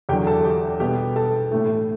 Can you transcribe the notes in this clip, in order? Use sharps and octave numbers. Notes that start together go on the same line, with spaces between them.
E2 D3 F#3 G4 G5
A4 A5
G4 G5
B2 G3 B3 G4 G5
A4 A5
A2 E3 A3